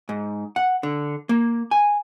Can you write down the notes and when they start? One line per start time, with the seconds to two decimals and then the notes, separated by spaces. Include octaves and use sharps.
0.09 G#2
0.56 F#5
0.83 D3
1.29 A#3
1.71 G#5